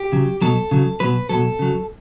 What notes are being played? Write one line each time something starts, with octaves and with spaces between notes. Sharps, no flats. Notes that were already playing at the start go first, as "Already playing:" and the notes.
Already playing: G4
C#3 F#3
B2 F#3 A4
C#3 F#3
B2 F#3 B4
B2 F#3 A4
C#3 F#3